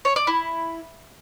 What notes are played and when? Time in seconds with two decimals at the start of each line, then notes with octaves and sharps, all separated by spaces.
0.05 C#5
0.16 D5
0.27 E4